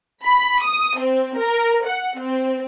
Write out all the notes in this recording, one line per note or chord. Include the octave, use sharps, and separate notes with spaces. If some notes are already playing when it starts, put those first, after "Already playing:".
B5
D#6
C4
A#4
F#5
C4